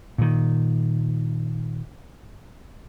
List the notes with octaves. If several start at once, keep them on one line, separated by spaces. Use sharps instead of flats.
A#2 D#3